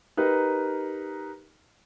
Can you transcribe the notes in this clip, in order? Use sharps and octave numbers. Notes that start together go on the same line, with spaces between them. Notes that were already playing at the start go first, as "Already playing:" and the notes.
D#4 G4 A#4 B4